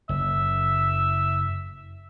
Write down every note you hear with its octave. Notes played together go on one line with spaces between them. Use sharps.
F#1 E5